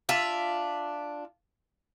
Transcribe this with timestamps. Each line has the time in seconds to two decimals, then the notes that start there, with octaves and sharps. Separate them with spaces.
0.09 D4 F4 E5